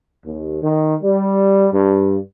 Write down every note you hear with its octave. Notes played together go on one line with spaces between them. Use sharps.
D#2
D#3
G3
G2